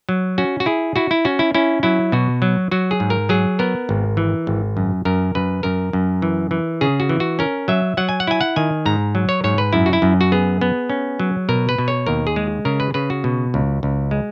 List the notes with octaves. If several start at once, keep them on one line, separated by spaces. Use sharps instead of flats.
F#3
C#4 F#4
F#4
E4 G#4
E4 F#4
E4
C#4 F#4
E4
C#4 E4
F#3 E4
B2 F#4
F#3
F#3 F#4
G#4
G#2
A#4
F#3 G#4
B3 A#4
G#1
E3
G#1
F#2
F#2 A#4
F#2 B4
F#2 A#4
F#2
E3
E3
C#3 G#4
F#4
E3
F#4
C#4 A#4
F#3 E5
F#3 F#5
G#5
F#5
E4 G#5
F#5
D#3 G#5
G#2 A#5
F#3
C#5
G#2 C#5
B4
F#2 E4
F#4
E4
F#2
F#4
B3 G#4
B3
C#4
F#3
B2 A#4
B4
B2
C#5
D#2 A#4
G#4
G#3
C#3 A#4
B4
C#3 B4
F#4
B2
C#2
C#2
G#3